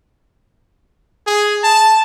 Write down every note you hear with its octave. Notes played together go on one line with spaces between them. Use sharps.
G#4
A5